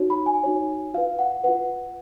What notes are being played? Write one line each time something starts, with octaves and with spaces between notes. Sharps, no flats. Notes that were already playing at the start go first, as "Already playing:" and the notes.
Already playing: D#4 F#4 C#5
B5
G#5
D#4 F#4 C#5
F4 B4 F5
F#5
F4 B4 F#5